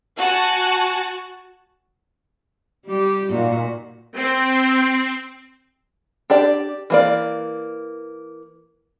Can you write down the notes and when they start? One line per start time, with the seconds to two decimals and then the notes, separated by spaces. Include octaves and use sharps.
0.18 F#4 F#5 G#5 A5
2.85 G3 G4
3.31 A#2 D#4 F#4
4.16 C4
6.30 D4 G4 D5
6.90 E3 A#3 D5